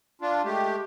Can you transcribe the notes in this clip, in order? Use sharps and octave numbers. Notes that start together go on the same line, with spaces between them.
D4 F4
G#3 A3 G4